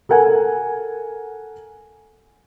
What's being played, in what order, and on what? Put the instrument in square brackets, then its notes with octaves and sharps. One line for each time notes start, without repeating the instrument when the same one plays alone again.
[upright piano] A4 A#4 F#5 G#5